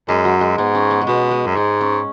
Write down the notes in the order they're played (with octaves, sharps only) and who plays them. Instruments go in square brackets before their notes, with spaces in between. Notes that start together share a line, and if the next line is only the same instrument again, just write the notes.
[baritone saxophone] F#2 [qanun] G#3
[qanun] F#3
G#3
[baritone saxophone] G#2 [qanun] B3
[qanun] C#4
B3
G#3
[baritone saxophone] B2 [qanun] B3
[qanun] G#3
[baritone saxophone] F#2
[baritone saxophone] G#2 [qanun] G#3
[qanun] C#4